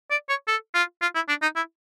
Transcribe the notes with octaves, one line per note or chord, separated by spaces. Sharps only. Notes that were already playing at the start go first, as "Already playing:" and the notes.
D5
C#5
A4
F4
F4
E4
D4
D#4
E4